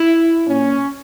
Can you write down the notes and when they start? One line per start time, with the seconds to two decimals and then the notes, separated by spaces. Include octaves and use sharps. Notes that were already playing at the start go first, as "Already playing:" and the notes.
Already playing: E4
0.47 A#2 C#4